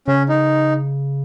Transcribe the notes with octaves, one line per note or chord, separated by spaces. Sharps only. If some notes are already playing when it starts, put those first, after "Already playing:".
C#3 C#4
D#4